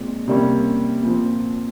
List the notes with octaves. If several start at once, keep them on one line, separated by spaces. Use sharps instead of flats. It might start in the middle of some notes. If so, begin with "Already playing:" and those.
Already playing: A#2 G#3 C4
C3 G3 A#3 C#4
A#2 F3 C4